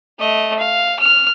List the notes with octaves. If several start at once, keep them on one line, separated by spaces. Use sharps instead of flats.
A3 D#5
F5
F6